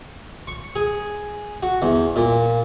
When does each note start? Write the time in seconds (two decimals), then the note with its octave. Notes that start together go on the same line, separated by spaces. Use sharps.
0.47 C#6
0.75 G#4
1.63 F#4
1.82 E2
2.16 A#2